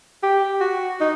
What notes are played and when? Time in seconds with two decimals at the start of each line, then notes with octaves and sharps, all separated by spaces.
0.23 G4
0.60 F#4
1.00 D#4